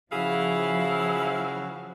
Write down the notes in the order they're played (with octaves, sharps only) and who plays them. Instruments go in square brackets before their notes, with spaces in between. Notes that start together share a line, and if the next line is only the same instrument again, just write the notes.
[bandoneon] C#3 F#4 [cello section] F3 [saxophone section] E4 F5 [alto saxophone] G#4